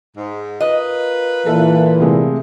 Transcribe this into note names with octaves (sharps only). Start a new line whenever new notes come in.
G#2
F4 A#4 B4 D#5
A#2 E3 A4 E5
C3 G#3 A3